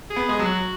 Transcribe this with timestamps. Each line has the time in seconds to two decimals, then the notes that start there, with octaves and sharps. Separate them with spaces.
0.10 G#4
0.16 B3
0.29 G#3 G#4
0.39 F#3
0.45 F#4